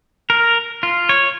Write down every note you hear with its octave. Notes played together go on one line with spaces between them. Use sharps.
A#4
F4
C#5